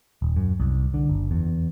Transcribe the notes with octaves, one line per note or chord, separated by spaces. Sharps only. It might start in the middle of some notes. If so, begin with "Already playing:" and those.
D#1
F#2
C2
D3
F#1
E2